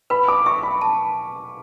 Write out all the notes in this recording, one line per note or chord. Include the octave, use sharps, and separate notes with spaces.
B4 B5
D6
E5 C#6
B5
A5